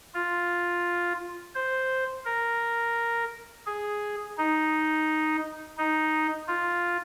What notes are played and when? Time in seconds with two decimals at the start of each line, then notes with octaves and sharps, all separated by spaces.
0.14 F4
1.55 C5
2.25 A#4
3.66 G#4
4.38 D#4
5.77 D#4
6.48 F4